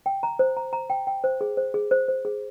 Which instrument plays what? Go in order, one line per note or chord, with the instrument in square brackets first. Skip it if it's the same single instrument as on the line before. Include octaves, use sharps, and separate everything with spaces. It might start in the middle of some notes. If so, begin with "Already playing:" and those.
[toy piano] G5
A#5
C5
A#5
A#5
G5
G5
C5
G#4
C5
G#4
C5
C5
G#4